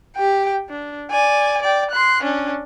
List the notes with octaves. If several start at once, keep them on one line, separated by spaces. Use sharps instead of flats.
G4 G5
D4
D5 G#5
D5 G5
C6 F#6
C#4 D4